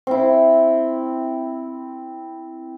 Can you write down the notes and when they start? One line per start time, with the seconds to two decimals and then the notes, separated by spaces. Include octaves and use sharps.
0.07 C4 E4